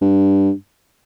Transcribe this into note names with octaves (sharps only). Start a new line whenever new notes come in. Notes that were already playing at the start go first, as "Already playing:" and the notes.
G2